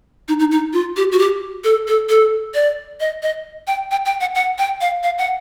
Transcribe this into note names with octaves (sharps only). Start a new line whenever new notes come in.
D#4
D#4
D#4
F4
G4
F#4
G4
A4
A4
A4
D5
D#5
D#5
G5
G5
G5
F#5
F#5
G5
F5
F5
F#5